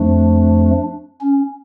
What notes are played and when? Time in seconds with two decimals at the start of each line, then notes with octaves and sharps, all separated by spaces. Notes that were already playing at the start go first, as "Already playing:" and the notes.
Already playing: F2 F3 A3 D4
1.21 C#4